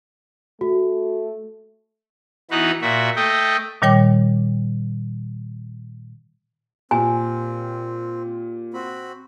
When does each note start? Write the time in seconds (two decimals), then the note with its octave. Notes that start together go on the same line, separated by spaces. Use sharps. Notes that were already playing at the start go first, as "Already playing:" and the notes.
0.61 A3 F#4
2.51 E3 B3 D#4 F#4 B4
2.81 A#2 F#4 E5
3.16 A3 D#5 G5
3.82 A#2 D#3 G3 C#5 G5 D6
6.91 A#2 C4 G4 G#5
8.74 C4 F#4 B5